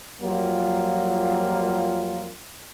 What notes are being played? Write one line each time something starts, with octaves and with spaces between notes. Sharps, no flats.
F2 F#3 G3 A#3 F4